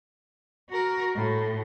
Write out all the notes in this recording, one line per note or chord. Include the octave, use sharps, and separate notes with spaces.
F#4 A#4
A2